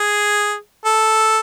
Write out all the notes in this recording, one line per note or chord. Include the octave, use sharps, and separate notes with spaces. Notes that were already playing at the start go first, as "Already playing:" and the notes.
Already playing: G#4
A4